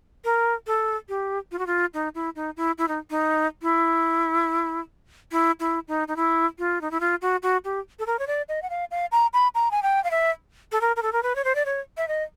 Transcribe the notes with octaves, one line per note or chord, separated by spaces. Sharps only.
A#4
A4
G4
F4
F#4
F4
D#4
E4
D#4
E4
E4
D#4
D#4
E4
E4
E4
D#4
D#4
E4
F4
D#4
E4
F4
F#4
F#4
G4
A4
A#4
C#5
D5
D#5
F#5
F5
F5
A#5
B5
A#5
G#5
G5
F5
E5
A4
A#4
A#4
A4
A#4
B4
C#5
C5
D5
C#5
E5
D#5